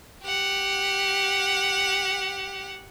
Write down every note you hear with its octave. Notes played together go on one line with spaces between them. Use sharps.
G4 F#5